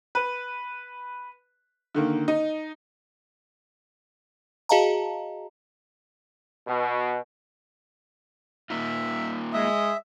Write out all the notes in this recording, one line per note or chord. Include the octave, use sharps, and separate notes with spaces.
B4
D3 D#3 A#3
D#4
F#4 G#4 D#5 F5 A5 A#5
B2
A#3 D#4 F4 E5
G#3 D#5 E5